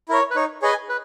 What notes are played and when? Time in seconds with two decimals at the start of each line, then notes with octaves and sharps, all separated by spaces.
0.09 E4 A#4 C#5
0.31 B4
0.36 D#4 C#5
0.62 G#4 B4 C#5 D#5 G#5
0.89 B4